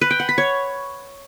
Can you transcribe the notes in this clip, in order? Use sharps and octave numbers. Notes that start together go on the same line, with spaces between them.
B4
G5
F#5
B5
C#5